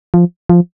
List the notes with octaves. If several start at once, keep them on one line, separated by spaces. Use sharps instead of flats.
F3
F3